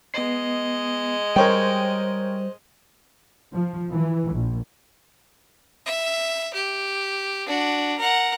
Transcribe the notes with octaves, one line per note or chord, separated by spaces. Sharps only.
G#3 B3 D#5 C7
G3 A#4 C5 C#5 G5
F3
E3
A#1
E5
G4
D4 F#4
A#4 F#5